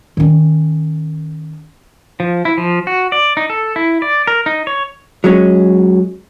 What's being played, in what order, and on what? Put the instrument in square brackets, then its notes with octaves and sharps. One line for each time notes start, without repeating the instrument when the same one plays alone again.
[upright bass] D#3 C#4
[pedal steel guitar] F3
E4
F3
F#4
D5
D#4
A4
E4
D5
A#4
D#4
C#5
[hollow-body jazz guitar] F#3 G#3 C#4